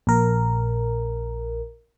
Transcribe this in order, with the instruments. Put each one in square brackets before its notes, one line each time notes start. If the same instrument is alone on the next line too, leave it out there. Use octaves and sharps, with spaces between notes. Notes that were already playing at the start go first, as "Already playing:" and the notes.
[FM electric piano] A#1 A#4